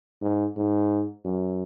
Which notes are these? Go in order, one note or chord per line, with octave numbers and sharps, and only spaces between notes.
G#2
G#2
F#2